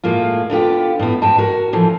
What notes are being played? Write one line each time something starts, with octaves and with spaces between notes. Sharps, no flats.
A2 G#3 A#3 F4
D3 B3 F4 G4
A2 B3
G#2 G#3 G5 A5
F#4 A#4
A2 E3 F3